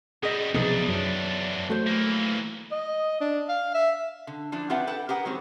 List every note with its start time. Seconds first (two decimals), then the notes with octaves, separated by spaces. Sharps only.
0.23 F#2 G3 G#4 D#5
0.54 B1 E2 C3 F3 B3 D4 D#4 G#4
0.88 F#2 F#3
1.70 A3 F#4 C5
1.86 E3 A#3
2.72 D#5
3.21 D4
3.49 F5
3.74 E5
4.27 D3
4.52 E3 F3 D4
4.70 C4 F4 G4 B4 E5 F#5
4.87 A4 B4 F#5 G5
5.09 G4 G#4 A#4 B4 F#5
5.25 D#3 F#3 G#3 C4